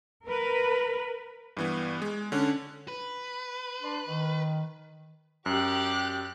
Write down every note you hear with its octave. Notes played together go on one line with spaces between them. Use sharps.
A#4 B4
G2 E3 B3
G#3
D3 C#4 D4
B4
D4 C6
D#3
F#2 G4 F#6